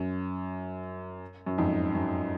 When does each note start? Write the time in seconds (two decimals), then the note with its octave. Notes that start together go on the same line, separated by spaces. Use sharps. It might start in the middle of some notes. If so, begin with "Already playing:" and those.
Already playing: F#2
1.46 F#2
1.58 F2 G#2
1.95 F#2